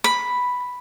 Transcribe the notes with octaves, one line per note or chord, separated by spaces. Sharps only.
B5